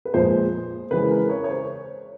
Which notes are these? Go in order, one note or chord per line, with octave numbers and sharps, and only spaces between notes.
B4
A#2 F3 G#3 C5
C#3 E3 G#3 B4
A#4
C#5
C#5
C5